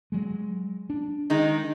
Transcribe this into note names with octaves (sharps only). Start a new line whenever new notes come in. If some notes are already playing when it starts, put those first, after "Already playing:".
F#3 G#3
D4
D#3 G#3 D#4